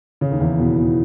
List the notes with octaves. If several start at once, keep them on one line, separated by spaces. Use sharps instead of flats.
C#3
D#2 D#3
E2 E3
B2 B3
B2 B3